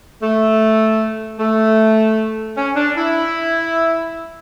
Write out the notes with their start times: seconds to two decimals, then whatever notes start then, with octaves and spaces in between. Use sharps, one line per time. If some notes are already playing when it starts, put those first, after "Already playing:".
0.22 A3
1.40 A3
2.57 C#4
2.76 D4
2.97 E4